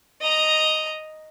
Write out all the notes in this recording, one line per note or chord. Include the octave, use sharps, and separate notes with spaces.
D#5 A#5